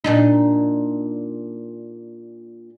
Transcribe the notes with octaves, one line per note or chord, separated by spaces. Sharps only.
A#2 D4 D#4